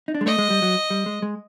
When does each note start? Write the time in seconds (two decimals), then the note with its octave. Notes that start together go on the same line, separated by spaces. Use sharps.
0.08 D#4
0.14 D4
0.21 G#3
0.26 A3 D#5
0.38 G#3
0.50 G3
0.62 F#3
0.90 G3
1.06 G#3
1.22 G#3